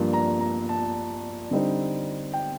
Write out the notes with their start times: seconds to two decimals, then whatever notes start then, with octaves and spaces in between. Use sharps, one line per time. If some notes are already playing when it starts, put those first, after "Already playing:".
Already playing: G2 F3 A#3 D4
0.13 A#5
0.41 A#5
0.69 A5
1.51 D3 G3 C4 D#4
2.33 G5